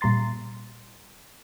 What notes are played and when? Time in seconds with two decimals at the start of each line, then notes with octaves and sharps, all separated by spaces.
0.01 A#2 G3 A#5 C6 A6